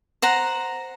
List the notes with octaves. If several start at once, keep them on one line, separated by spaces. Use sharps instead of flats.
C5 F#5 A#5